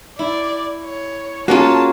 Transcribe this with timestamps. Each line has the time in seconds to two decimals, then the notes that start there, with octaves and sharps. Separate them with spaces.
0.19 E4 D5
0.84 C#5
1.48 A#3 C#4 F4 F#4 G#4 A5